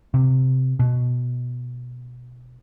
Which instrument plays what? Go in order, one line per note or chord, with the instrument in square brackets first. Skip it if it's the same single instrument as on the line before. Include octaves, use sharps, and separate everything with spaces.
[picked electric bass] C3
B2